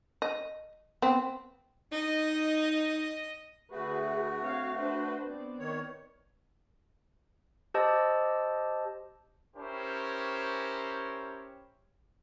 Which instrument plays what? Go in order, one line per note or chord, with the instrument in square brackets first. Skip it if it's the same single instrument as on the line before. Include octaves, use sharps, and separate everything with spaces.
[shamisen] D#5
B3 C4
[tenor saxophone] D#4 [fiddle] D#5
[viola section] D3 G#4 B4 [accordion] A3 F#4
[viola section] C4 C#5 F5
D4 B4 C5
B3 C4 D5
[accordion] D#3 C#5
[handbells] G4 C5 D#5 A5 E6
[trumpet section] C#4 E4 G4 A#4 C5 C#5